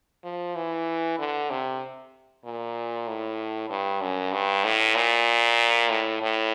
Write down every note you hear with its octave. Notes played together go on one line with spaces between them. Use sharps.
F3
E3
D3
C3
A#2
A2
G2
F#2
G2
A2
A#2
A2
A2